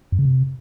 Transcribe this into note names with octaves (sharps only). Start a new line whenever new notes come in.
F#2
C#3
C3